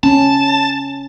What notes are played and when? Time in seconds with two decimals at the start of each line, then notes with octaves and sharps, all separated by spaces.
0.03 C#4 A5